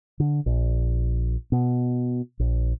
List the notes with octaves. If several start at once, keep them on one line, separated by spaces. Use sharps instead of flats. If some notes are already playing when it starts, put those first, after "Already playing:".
D3
A#1
B2
A#1